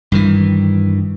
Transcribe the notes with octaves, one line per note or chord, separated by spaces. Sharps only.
G2 D#3 E3